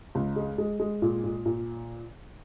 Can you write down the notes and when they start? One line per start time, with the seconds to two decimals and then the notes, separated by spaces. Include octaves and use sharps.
0.15 C#2
0.36 G#3
0.58 G#3
0.80 G#3
1.02 A#2
1.24 A#2
1.46 A#2